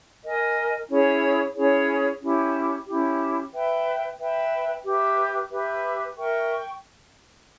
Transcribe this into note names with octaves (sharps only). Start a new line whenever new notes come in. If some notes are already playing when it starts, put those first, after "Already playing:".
A#4 D#5 G#5
C#4 E4 G#4 C#5
C#4 E4 G#4 C#5
C#4 E4 G4
C#4 E4 G4
B4 E5 G5
B4 E5 G5
G4 B4 E5
G4 B4 E5
A#4 E5 G5 C#6